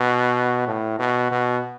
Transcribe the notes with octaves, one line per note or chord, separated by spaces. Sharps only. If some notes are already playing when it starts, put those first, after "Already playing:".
Already playing: B2
A2
B2
B2